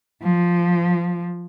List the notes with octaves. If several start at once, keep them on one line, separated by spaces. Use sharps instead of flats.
F3